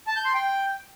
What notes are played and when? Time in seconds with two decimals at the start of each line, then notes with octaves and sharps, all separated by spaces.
0.07 A5
0.16 G6
0.25 C6
0.34 G5